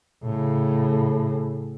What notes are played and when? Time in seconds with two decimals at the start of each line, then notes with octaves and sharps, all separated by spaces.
0.24 A2 C#3